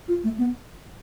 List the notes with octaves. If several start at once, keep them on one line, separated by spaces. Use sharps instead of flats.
F4
A3
B3